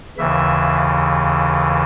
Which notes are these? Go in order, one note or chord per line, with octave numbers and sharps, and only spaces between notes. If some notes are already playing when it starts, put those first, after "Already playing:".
D#2 C#3 E3 E5